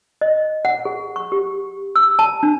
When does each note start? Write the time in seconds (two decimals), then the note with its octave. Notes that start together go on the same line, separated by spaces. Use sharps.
0.21 D#5
0.65 F#5
0.85 G#4
1.16 C#6
1.32 G4
1.96 E6
2.19 A5
2.43 D4